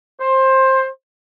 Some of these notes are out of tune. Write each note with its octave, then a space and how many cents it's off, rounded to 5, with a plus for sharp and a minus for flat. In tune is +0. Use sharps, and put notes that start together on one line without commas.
C5 +20